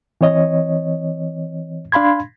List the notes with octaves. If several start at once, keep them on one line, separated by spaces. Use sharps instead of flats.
E3 C4 C#5 D#5
D4 F5 B5 C6 G#6